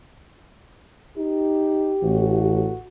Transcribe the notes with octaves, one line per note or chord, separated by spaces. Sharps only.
D#4 G4
A1 F#4